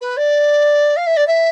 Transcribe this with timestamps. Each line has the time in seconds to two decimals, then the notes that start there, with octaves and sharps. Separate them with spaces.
0.01 B4
0.17 D5
0.96 F5
1.07 E5
1.17 D5
1.27 E5